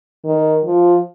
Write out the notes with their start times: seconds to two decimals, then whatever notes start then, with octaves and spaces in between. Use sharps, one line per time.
0.25 D#3
0.65 F3